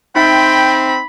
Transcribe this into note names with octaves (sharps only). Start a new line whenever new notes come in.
C4 D#4 E5 G5 B5 C6